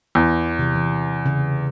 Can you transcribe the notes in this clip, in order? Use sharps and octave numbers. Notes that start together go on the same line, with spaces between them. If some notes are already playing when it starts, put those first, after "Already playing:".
E2
C3 E3
E3
C#3